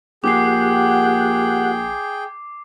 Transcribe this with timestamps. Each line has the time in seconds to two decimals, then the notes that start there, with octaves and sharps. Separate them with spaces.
0.24 A#1 G4 G#4 F#5 G5 D6 C7